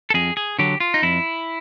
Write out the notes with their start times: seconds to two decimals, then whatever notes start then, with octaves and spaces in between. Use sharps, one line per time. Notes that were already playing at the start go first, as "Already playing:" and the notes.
0.10 A4
0.14 F2 G#4
0.37 G#4
0.59 D3 F#3 G4
0.80 F4
0.94 D#4
1.03 F2 E4